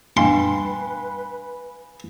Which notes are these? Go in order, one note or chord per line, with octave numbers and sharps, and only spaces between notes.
G3 D4 B4 F5 G5 G#5 C6